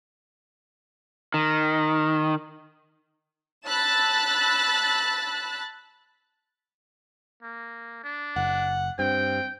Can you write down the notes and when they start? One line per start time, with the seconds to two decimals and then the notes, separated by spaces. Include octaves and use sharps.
1.34 D#3
3.67 A5 B5 E6 F#6 A6
7.42 A#3
8.03 D4
8.36 F#1 F#5
8.99 G2 C4 G5